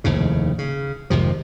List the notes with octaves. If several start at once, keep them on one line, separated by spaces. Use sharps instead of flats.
F1 D#2 A2 C#3
C#3
G#1 F2 C3 F3